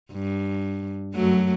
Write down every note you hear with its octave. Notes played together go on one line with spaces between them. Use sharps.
G2
F#2 F#3 A3